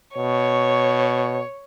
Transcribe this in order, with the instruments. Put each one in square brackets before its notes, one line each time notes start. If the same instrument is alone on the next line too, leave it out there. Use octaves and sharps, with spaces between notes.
[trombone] B2 [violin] C#5